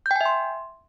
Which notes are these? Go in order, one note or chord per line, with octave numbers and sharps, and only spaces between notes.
E5 G5 G#5 C6 G6